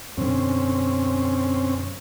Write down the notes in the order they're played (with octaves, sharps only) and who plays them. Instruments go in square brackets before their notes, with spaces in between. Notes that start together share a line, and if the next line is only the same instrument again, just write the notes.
[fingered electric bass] F#2 B2 D3 [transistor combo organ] C4 C#4